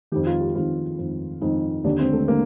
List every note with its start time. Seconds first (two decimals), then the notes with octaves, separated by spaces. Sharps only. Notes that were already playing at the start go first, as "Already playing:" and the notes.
0.12 D#3 G4
0.16 F2
0.27 F4
0.41 G4
0.55 F2 D#3 F4
0.98 F2 D#3
1.42 F2 D#3 D#4
1.84 D#2 D3 D4
1.99 C4
2.13 A3
2.28 D3 A#3